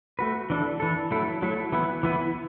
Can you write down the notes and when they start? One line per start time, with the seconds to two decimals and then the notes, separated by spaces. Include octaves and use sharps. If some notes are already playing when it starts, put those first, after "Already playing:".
0.19 A3 F#4 B4
0.50 E3 D4 A4
0.80 E3 D4 A4
1.11 F#3 A3 E4 A4
1.42 F#3 A3 E4 A4
1.72 E3 B3 E4 B4
2.03 E3 B3 E4 B4